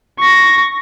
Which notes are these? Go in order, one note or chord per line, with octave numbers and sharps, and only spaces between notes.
C#6 A#6